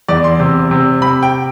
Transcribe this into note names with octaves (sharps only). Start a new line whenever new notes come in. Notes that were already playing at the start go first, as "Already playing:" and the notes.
E2 D5
C6
C3
C3
C3 B5
G5